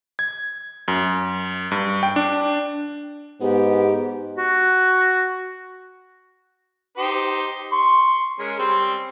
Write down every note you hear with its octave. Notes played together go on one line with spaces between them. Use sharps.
G#6
F#2
G2
G5
D4
G#2 B3 G4
F#4
D#4 G4 C5
C6 C#6
G#3 C#4 A#4
G3 C4 C5